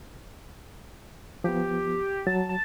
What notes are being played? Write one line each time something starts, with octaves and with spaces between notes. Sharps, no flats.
F3 B3 G4
F#3 A5
A5